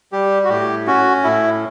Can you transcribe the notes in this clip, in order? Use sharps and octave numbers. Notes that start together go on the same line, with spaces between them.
G3 G4
F#4
A2 G4
C#4 F#4
A2 E4